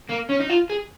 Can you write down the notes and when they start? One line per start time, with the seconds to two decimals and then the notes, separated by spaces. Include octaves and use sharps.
0.10 A#3
0.30 C#4
0.40 D#4
0.50 F4
0.70 G#4